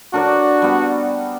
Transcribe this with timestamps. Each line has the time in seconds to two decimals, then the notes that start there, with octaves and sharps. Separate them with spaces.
0.14 D4 F#4 A#4 D5
0.62 G3 B3